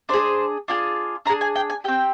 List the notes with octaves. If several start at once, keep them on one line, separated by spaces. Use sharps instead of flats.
D4 G#4 C5
D4 F4 G#4
D4 G#4 A#5
G#5
G5
G#5
C4 G4 G5